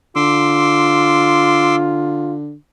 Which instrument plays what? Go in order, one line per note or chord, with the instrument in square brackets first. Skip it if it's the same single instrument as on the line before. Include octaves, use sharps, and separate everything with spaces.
[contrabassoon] D3 [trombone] F4 [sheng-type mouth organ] C6 D6 E6